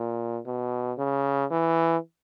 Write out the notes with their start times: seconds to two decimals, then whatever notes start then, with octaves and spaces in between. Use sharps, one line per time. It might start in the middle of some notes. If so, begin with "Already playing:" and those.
Already playing: A#2
0.46 B2
0.98 C#3
1.50 E3